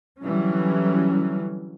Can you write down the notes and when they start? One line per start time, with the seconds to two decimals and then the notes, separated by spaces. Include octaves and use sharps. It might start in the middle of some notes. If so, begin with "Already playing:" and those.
0.21 D3 E3 F#3 G3 C#4